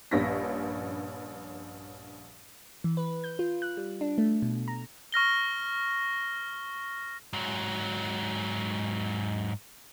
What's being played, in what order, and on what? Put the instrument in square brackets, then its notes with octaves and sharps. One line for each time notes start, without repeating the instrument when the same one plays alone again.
[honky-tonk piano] A#1 G2 C#4 A#6 B6
[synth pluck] E3
B4
G6
F4
F#6
G3
D4
A3
B2
A#5
[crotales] C#6 F6 A#6 G7
[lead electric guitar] G#2 F#3